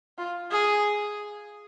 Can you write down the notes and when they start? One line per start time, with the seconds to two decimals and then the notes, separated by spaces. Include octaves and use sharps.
0.18 F4
0.51 G#4